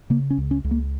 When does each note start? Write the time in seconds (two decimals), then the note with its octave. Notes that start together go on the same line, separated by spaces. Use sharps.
0.10 C#3 A#3
0.30 C#4
0.38 C#2
0.51 C#4
0.64 C#2
0.71 A#3